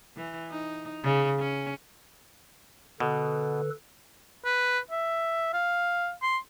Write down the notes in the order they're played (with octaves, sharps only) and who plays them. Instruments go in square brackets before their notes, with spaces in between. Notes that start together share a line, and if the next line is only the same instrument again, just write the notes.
[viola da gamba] E3
D#4
C#3
C#4
[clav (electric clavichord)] B2 [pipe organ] D3 A4 B4
[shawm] B4
E5
F5
C6